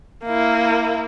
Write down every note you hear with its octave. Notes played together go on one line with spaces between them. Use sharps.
A#3 E4